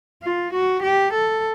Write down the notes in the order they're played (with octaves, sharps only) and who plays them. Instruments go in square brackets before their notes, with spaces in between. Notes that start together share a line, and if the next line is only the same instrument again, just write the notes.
[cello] F4
F#4
G4
A4